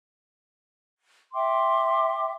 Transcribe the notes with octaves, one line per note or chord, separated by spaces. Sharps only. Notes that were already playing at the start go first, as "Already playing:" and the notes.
E5 G5 C6 D6